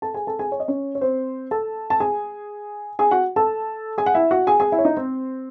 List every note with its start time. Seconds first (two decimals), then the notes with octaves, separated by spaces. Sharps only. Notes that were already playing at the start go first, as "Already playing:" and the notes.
0.02 A4 A5
0.14 G#4 G#5
0.27 A4 A5
0.39 G#4 G#5
0.52 C#5
0.60 D#5
0.68 C#4 C#5
0.95 C#5
1.01 C4 C5
1.51 A4 A5
1.90 A5
2.00 G#4 G#5
2.99 G#4 G#5
3.11 F#4 F#5
3.36 A4 A5
3.98 G#4 G#5
4.06 F#5
4.15 E4 E5
4.31 F#4 F#5
4.47 G#4 G#5
4.60 G#4 G#5
4.72 E4 E5
4.78 C#5
4.85 D#4 D#5
4.97 C4 C5